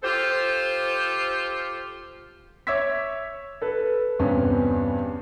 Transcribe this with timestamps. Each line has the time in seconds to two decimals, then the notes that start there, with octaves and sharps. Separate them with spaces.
0.03 F4 G4 A4 C5
2.67 C#5 E5 D6 E6 G#6 B6
3.62 A4 B4
4.19 E2 G2 C3 B3 C#4